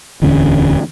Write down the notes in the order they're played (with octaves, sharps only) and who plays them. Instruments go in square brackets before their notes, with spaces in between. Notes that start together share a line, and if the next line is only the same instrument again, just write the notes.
[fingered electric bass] D1 E2 D3 C#4